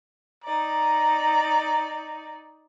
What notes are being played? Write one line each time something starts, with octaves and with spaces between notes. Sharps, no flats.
D#4 D5 A#5